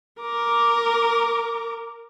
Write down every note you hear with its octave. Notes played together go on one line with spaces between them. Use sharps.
A#4 D6